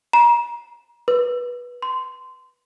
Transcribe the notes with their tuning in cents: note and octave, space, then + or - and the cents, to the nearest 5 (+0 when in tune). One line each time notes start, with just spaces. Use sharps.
A#5 +35
B4 -15
C6 -20